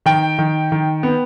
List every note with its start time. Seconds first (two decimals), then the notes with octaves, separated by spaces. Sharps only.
0.06 D#3 G5
0.39 D#3
0.72 D#3
1.03 B3